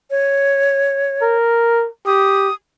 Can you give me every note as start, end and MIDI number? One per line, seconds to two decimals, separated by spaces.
0.10 1.35 73
1.22 1.87 70
2.06 2.48 67
2.06 2.54 87